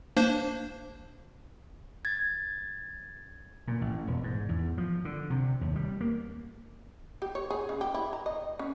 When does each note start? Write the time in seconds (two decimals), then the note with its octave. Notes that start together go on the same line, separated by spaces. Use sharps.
0.17 A#3 D4 C5
2.05 G#6 A6
3.68 A#2
3.81 A1
4.07 E1
4.24 G#2
4.49 E2
4.78 F3
5.05 D3
5.30 C3
5.61 D#2
5.76 G3
6.01 A#3
7.22 G4
7.35 C#5
7.50 G#4
7.69 C#3
7.81 G4
7.94 E4
8.13 A#5
8.26 D#5
8.59 C#4